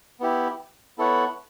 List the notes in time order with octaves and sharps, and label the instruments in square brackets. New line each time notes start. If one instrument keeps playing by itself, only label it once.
[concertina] B3 E4 G4
B3 E4 A4 C#5 F#5